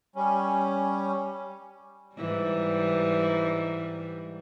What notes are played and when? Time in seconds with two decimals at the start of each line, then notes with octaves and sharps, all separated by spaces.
0.16 G3 C#4
2.16 G#2 E3 G3